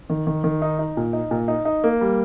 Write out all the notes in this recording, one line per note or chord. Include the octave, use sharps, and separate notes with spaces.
D#3
D#3
D#3
D#4
D#4
A#2
D#4
A#2
D#4
D#4
A#3
G3